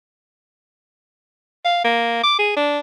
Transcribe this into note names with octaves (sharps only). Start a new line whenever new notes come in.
F5
A#3
D6
G#4
D4